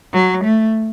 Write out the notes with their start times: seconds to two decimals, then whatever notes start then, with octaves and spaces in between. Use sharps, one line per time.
0.13 F#3
0.44 A3